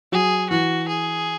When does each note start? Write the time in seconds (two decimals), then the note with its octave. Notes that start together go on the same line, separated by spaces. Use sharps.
0.12 F#3 G#4
0.50 E3 F#4
0.88 G#4